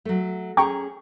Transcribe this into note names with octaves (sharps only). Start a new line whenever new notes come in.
F#3 A3
C#4 G#4 G5 A#5 C#6